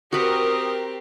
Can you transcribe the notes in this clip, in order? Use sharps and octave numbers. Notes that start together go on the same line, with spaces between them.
C4 F#4 G4 A#4 B4 D#6